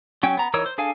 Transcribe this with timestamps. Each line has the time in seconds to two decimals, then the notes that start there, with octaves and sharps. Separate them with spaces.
0.23 F#3 C#4 G5
0.37 B3 A#5
0.54 E3 D#4 A#4 C#5 E6
0.66 C5
0.78 D4 G#4 A4 F5 G#5